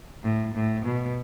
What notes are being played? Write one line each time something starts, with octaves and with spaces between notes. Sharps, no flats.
A2
A2
B2